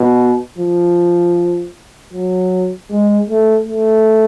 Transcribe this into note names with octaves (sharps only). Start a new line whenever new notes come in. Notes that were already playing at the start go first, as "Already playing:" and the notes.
Already playing: B2
F3
F#3
G#3
A3
A3